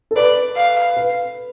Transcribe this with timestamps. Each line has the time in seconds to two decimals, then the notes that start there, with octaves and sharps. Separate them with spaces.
0.11 A4
0.16 B4 D5
0.57 F5
0.97 B4